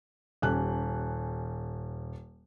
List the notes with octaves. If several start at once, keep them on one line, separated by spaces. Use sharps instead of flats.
D#1 C#4 G4 F#6